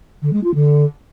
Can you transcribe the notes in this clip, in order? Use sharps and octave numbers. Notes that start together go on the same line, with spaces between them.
D3
G#3
F4
D3